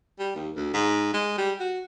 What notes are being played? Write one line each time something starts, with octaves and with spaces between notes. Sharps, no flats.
G3
D#2
D2
G#2
G#3
G3
F#4